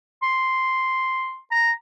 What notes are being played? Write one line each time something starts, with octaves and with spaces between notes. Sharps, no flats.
C6
A#5